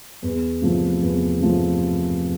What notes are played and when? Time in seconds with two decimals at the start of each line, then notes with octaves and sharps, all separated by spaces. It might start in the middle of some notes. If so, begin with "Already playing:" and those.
0.23 E2
0.62 C3 F3 A3
1.02 E2
1.40 C3 F3 A3